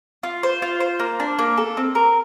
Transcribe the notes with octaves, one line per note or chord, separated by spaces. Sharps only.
F4
C5
F4
C5
A#3
D4
A#3
A4
C4
A#4